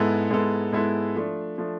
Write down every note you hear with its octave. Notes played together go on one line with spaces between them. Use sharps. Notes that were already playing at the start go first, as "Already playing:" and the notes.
Already playing: G#2 G#3 B3 E4 A4
G#2 G#3 B3 E4 A4
G#2 G#3 B3 E4 A4
F3 A3 D4
F3 A3 D4